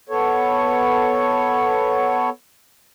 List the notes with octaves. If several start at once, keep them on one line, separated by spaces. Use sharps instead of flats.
B3 A4 C#5